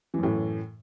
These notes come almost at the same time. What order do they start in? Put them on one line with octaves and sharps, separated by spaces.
E3 F#2 A2